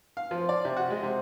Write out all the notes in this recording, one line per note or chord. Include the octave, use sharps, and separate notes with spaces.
F5
F3
D5
C3
F#4
G#3
C3